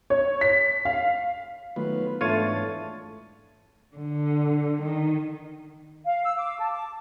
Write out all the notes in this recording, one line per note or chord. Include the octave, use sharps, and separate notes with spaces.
C#5
B6
F5
D#3 F#3 A3 B3 F4 B4
G#2 E3 A3 D4 F4 C#5 A6 D#7
D3
D#3
F5
E6
D6
A5
D6